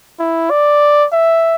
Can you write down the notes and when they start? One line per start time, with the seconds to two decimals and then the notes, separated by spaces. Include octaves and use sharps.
0.19 E4
0.50 D5
1.13 E5